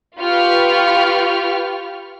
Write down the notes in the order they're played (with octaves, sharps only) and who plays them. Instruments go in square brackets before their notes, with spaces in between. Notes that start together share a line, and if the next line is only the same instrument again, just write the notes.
[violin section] F4 G4 B4 C#6 F6